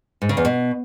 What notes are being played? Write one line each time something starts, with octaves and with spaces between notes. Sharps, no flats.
G#2
C#3
E2
B2